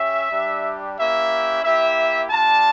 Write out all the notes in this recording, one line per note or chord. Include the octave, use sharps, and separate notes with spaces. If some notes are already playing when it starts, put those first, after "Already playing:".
Already playing: C#4 G4 E5
G3 D4 G4
A#3 C#4 E4 G4 E5
A#3 E4 G4 E5
G3 D4 F4 A5